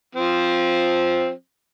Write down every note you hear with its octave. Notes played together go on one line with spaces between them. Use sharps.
F3 C4